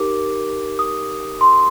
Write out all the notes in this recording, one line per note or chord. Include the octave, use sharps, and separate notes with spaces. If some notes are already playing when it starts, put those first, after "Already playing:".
Already playing: D#4 G4 A#4 D6
D#6
C6